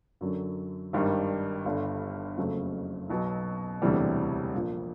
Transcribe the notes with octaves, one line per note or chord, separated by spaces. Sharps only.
F#2 D3 F#3
G#1 G2 D#3 G3
G1 G2 D3
F#1 F2 C#3 F#3 A3
B1 B2 F#3 B3
E1 D2 C3 E3 G3
A#1 A#2 F3